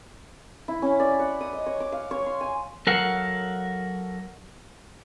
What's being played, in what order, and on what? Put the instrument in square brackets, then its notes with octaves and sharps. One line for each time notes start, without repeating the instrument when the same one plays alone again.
[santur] E4
C#4
D5
F#5
D#6
D#5
C#5
D6
F5
C#5
C6
G#5
[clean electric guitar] F#3 A4 A#4 F5 F#5